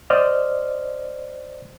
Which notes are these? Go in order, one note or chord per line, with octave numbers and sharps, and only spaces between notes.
C5 D5 D#5 F6